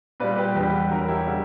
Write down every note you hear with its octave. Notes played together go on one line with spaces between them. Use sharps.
A#2 G3 B4 D5
G4 B4
E2 D3 G3 G4 B4
E2 D3 F#3 F#4 A#4
E4 G4
C#3 G3